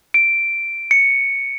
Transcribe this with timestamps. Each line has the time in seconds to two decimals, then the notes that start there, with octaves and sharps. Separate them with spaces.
0.14 D7
0.91 C#7